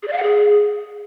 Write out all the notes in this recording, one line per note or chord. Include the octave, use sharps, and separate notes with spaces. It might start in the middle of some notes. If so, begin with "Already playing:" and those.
G#4
D5
F5
F#5
G#4